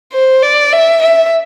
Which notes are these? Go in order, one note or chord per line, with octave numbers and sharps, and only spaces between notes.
C5
D5
E5
E5